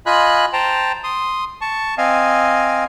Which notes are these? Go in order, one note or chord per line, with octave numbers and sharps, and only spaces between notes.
F4 D#5 G#5 B5 F#6
C5 G5 A5 A#5
C6 D#6
A5 C#6
C4 D#5 F5 G#5